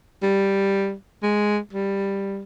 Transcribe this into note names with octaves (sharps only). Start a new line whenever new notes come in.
G3
G#3
G3